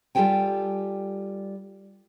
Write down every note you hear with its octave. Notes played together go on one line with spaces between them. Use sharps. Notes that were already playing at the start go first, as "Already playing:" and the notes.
G3 F4 G4 A4 G5 G#5